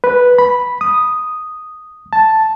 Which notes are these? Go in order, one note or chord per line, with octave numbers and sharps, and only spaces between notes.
B4
B5
D#6
A5